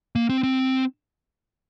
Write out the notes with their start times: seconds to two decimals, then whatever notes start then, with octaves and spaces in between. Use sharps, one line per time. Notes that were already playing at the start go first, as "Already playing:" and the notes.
0.16 A#3
0.29 C4
0.43 C4